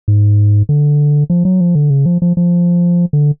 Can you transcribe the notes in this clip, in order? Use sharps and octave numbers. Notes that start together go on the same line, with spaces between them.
G#2
D3
F3
F#3
F3
D3
C#3
F3
F3
F3
D3